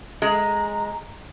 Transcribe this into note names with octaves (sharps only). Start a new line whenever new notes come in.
G#3 A#5